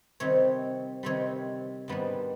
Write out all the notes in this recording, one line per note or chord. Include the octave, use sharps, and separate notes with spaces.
C3 D#3 G3 C4 C#5
C3 D#3 G3 C4 C#5
G#2 D#3 G3 B3 D4